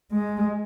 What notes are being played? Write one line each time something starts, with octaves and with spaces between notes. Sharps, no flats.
G#3